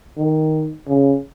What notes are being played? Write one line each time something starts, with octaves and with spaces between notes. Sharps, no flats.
D#3
C#3